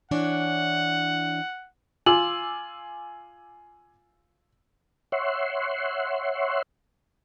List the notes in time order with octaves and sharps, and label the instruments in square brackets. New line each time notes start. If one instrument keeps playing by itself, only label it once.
[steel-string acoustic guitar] E3 D4 C#5 [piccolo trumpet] F#5
[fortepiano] F4 [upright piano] G#5 D6 E6 [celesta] F#7
[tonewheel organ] C#5 E5 F#5 C6